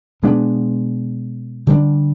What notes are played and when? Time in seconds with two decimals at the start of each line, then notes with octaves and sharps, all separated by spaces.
0.23 B2 G#3 B3 D4
1.67 D3 G3 D4